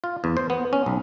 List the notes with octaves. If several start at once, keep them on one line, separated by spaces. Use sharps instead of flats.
F4
E2
C5
B3
C#4
B1